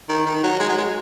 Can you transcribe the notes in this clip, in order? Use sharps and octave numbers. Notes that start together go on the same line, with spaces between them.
D#3
D#3
F#3
G#3
F#3
G#3